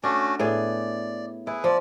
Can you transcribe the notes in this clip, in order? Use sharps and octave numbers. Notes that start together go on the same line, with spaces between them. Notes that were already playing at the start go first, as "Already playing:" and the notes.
A3 C#4 D4 F#4
A2 B3 G#4 D5
E4 G#4 B4
F3 D5